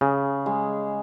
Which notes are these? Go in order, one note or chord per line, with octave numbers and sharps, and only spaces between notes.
C#3 G#4
G#3